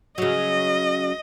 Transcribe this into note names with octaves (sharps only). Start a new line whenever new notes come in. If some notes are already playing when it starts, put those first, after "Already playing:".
C#3 F#3 D#5